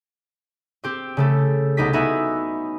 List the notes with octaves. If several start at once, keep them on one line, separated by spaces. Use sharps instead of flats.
C4 G4 C5
C#3 A3 A4
C2 B3 D#4 G4 B6
B3 D#4 E4 F#4 E5 G#5